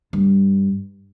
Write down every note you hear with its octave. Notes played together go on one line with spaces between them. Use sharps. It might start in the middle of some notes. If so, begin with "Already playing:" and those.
G2